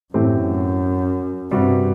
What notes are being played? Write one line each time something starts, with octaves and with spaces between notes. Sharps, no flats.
F#2 A2 E3 A3 C4 G4
G2 C3 G3 C4 F#4